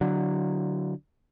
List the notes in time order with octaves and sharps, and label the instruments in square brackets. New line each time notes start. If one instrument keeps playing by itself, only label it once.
[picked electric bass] D3 F#3